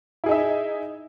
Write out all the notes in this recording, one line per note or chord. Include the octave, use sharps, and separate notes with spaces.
D#4 E4 G#4 E5